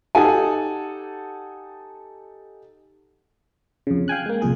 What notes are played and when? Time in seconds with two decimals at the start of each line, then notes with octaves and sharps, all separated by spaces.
0.15 D#4 G4 A4 F#5 G#5
3.87 F2 C#3
4.08 F5 G5 G#5 F#6
4.26 G#3 A#3
4.41 C2 F2 A#2 G#4 G#5